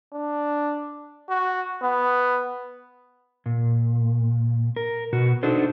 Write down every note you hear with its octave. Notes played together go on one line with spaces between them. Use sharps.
D4
F#4
B3
A#2
A#4
B2 F#4
D4 D#4 F#4 A4 C5